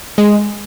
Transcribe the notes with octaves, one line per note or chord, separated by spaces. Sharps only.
G#3